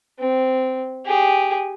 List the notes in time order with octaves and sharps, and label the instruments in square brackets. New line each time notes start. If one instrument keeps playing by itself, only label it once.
[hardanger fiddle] C4
G4 G#4